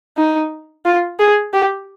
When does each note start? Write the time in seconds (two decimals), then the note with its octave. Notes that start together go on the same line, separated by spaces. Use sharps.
0.18 D#4
0.85 F4
1.19 G#4
1.53 G4